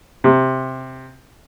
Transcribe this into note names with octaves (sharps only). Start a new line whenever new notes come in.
C3